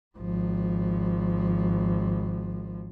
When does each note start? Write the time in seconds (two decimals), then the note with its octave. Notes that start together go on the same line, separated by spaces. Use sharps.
0.17 G#1 F3